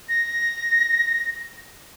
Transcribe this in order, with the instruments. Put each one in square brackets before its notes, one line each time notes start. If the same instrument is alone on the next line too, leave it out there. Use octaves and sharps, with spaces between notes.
[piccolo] A#6